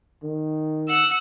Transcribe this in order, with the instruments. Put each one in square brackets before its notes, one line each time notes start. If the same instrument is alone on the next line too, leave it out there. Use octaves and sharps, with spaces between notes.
[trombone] D#3
[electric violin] F#5 E6